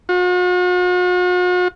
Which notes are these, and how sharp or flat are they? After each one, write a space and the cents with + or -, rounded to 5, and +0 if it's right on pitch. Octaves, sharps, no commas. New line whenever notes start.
F#4 -45